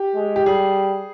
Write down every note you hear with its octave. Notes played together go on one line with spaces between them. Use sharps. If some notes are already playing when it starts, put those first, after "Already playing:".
Already playing: G4
G#3
G4
G3 G#4